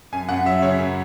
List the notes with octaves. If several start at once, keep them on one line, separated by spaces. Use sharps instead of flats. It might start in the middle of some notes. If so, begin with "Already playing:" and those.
F#2 G#5
F#2 F#5
F#3 E5
C#3 C#5
F#2